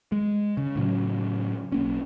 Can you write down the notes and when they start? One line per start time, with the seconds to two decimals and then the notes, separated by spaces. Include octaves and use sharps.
0.12 G#3
0.57 C#3
0.76 A2 C#3 F#3
1.72 B1 A#3 C#4